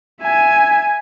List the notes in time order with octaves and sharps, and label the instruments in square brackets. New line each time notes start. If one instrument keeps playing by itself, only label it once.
[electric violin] E5 G#5